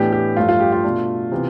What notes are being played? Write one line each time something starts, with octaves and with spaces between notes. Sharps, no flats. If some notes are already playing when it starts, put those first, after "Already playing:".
Already playing: A2 E3 B3 D4 G4
G4
G2 F3 A3 F4
F4
G4
F4
B2 A3 D4
C3 E3 B3